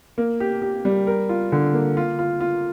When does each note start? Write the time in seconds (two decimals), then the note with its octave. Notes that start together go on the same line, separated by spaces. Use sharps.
0.18 A#3
0.40 G4
0.62 G4
0.85 G3
1.07 A#4
1.29 F4
1.52 D3
1.74 A#3
1.97 F4
2.19 F4
2.40 F4